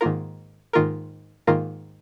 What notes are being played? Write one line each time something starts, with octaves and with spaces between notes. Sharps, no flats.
G#2 D#3 A#3 F4 A#4
G#2 D#3 A#3 F4 A#4
G#2 D#3 A#3 F4 A#4